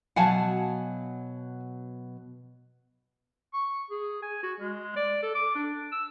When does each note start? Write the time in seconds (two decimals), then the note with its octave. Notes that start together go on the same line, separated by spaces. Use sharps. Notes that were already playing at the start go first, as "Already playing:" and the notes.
0.16 B2 F#3 F5 F#5 G#5 A5
3.54 C#6
3.90 G#4
4.23 G#5
4.43 F#4
4.60 G#3
4.96 D5
5.23 A4
5.35 D6
5.55 D4
5.92 E6